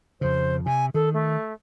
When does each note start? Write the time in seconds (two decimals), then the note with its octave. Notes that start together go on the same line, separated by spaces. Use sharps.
0.21 F2 C#3 C5
0.66 C3 G#5
0.94 D#3 A4
1.14 A3